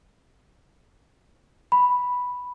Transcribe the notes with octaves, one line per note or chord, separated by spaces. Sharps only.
B5